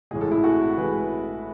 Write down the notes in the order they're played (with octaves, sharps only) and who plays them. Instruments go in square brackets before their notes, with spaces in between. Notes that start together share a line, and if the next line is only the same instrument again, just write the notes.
[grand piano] A1 A2 G#3 G#4
A4
E4 G#4
F#4 A4
A1 A2 G#3 G#4 B4